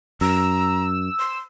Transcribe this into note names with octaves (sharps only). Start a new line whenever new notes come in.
F#2 A#5 E6
C6